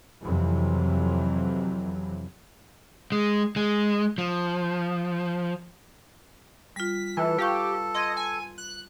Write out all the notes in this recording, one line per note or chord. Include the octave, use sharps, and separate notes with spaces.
F2 C3 E3 F#3
G#3
G#3
F3
G3 F4 B6
E3 F4 A4 B4
F4 G4 F5 C#6
D#5 C6 G#6
G#5
F#6